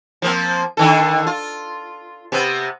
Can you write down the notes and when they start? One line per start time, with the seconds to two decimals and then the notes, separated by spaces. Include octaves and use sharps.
0.22 F3 A#3 C4
0.77 D3 D#3 A4
1.27 F4
2.32 C3 B3